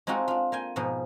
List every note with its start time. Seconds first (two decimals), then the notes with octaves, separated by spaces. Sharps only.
0.07 G#3 C4 D#4 F4 F#4 A4
0.28 D4 F4
0.52 A#3 G5 G#5
0.76 G#2 B2 F3 D#4